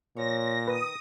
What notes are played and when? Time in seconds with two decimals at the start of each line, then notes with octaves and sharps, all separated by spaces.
0.17 A#2 F3 C#5 A#6
0.68 D#3 B4 D#6